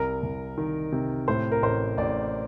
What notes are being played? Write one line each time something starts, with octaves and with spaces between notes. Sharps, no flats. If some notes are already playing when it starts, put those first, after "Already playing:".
Already playing: C2 A#4
C2
D#3
C3
A2 C5
A#4
A1 C5
A1 D5